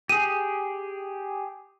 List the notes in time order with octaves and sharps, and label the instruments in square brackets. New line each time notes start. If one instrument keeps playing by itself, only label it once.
[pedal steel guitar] G4 G#4 [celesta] D#7